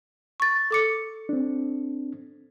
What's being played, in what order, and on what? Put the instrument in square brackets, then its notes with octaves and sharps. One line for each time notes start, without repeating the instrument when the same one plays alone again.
[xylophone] C#6 A6
A4 D6 C#7
[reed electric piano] C4 D4